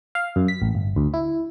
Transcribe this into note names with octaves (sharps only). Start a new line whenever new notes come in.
F5
F#2
B6
A1
G1
D2
E4